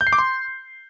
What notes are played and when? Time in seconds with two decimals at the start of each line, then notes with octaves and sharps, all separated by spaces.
0.01 G6
0.07 C7
0.13 D6
0.18 C6